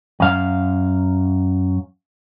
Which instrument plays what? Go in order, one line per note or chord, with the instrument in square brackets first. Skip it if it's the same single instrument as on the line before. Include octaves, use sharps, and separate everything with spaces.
[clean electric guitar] F#2 F5